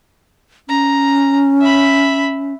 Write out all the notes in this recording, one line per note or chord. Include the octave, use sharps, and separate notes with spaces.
C#4 A#5
E5 B5